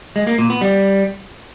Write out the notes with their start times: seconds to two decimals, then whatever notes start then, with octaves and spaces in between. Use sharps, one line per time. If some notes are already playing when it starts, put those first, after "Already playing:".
0.16 G#3
0.27 A#3
0.39 A#2
0.50 B3
0.61 G3